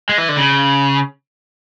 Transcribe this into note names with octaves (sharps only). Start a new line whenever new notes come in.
G#3
E3
D3
C#3